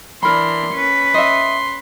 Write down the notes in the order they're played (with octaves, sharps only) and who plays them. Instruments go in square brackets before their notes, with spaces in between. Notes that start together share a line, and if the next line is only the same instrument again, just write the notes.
[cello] E3 D4 [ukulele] A#4 B5 [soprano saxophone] C6
[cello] C#4 B4
[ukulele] D#5 E5 [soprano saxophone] C6